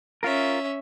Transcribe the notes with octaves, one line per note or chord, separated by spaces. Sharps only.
C#4 F4 A#4 E5